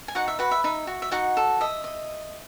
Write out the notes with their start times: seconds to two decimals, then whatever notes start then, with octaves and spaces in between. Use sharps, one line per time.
0.08 G#5
0.15 D#4 F#4 F#5
0.28 E5
0.39 F#4 B4 F#5
0.51 E5
0.64 D#4 E5
0.87 F#4
1.02 E5
1.11 D#4 F#4 F#5
1.37 A4
1.61 D#5 E5
1.84 D#5